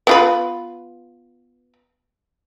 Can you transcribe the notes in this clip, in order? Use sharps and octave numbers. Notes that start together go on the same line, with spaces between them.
B3 F4 B4